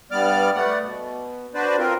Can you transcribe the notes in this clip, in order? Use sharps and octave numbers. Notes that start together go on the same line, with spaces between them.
G2 G3 B3 D5 D6 F6
A3 B3 D5 F#5
B2
D4 F#4 B4 C5 D5
C4 F4 A#4